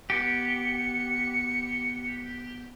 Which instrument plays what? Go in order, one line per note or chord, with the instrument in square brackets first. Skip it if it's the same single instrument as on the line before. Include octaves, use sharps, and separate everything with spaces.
[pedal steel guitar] B3 G4 [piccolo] C#7